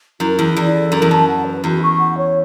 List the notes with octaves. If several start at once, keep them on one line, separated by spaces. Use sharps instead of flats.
F#2 E4
E2 E4
E2 D5
A4
F#2 E4
E2
F#2 A5
F#5
B4
E2 F#4
C#6
F#5
C#5